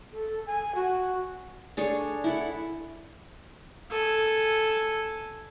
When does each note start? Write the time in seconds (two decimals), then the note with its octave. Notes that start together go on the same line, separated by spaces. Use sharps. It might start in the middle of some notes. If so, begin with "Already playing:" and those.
0.12 A4
0.46 G#5
0.75 F#4
1.77 D4 G#4 A4 C#5
2.24 E4 A4 F#5
3.91 A4 G#5